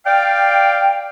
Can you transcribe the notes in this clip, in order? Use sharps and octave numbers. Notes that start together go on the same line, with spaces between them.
D5 F5 G5